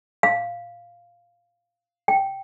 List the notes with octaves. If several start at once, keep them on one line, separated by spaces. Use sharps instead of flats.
F5
G5